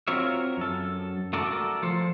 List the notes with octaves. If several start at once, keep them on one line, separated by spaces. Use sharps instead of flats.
C4 F4 F#4 A#4 C#5 E5
F#2 A4
A3 F#4 A4 A#4 D5
F3 A4 C5